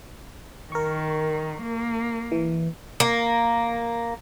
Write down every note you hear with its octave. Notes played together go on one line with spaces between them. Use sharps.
D#3 A#4 C#6
A#3
E3
A#3